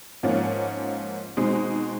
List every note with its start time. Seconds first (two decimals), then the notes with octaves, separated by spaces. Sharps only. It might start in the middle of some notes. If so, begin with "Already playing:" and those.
0.23 G#2 F3 A#3 C#4
1.37 B2 G#3 C4 D#4